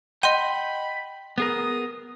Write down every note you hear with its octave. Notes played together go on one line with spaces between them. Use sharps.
D#5 F#5 G5 B5 C6 D#7
B3 G#4 A#4 D#6